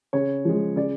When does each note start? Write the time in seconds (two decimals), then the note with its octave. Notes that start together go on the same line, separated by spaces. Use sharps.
0.13 C#3 C#5
0.45 F3 G#3
0.76 C#3 D5